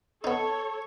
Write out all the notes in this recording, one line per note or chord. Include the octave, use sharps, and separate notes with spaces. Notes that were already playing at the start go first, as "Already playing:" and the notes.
B3 D#4 A4 C#5